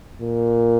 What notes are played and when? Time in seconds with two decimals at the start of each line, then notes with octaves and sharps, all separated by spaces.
0.21 A#2